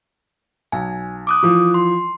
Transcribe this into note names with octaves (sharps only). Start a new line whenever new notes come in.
B1 G#5
D6 D#6 F#6
E3 F3
C6